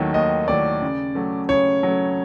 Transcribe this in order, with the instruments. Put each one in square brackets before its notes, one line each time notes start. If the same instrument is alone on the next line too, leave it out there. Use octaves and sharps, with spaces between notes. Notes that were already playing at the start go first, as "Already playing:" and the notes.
Already playing: [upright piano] D#2 D#3 F#3 A3
[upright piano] D#2 [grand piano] D#5
[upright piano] D#3 F#3 A3 [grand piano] D5
[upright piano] C#3
F#3 A3
[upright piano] C#3 [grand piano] C#5
[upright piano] F#3 A3